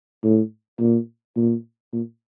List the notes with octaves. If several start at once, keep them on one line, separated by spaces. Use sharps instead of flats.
A2
A#2
A#2
A#2